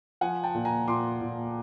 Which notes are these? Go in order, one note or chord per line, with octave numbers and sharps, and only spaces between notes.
F3 F#5 G#5
G5 A5
A#2
G#5 A#5
A#2 C6 D6
A#2